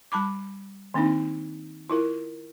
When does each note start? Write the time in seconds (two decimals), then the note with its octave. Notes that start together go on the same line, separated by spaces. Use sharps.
0.12 G3 A5 B5 D6
0.94 D#3 A#3 C4 D4 D#4
1.90 E4 F4 A#4